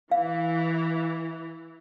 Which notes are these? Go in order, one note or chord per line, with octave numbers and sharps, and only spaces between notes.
E3 F5